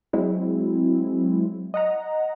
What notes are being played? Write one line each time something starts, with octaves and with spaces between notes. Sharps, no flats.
F#3 G#3 C4 E4
D#5 F#5 A#5